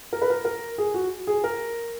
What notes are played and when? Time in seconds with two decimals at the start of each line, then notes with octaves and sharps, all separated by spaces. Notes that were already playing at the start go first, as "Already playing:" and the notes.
0.13 A#4
0.22 B4
0.30 A#4
0.45 A#4
0.78 G#4
0.94 F#4
1.27 G#4
1.44 A#4